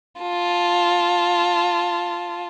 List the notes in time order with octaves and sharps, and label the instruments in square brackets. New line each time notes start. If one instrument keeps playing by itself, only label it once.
[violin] F4 A5